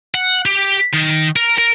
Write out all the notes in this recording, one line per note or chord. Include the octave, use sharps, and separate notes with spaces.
F#5
G4
D#3
A#4
A#4